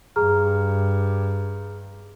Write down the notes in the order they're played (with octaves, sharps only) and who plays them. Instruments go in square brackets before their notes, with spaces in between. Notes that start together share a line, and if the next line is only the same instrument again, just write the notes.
[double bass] G2 [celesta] G#4 A#5 F6